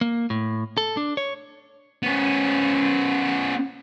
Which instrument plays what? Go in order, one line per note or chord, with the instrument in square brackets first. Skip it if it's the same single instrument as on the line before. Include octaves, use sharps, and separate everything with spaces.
[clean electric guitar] A#3
A2
A4
D4
C#5
[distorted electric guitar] B3 C#4